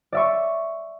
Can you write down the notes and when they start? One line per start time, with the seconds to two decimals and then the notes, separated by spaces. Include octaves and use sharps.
0.12 D5 E5 C#6